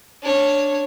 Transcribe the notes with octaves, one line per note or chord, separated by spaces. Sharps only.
D4 C#5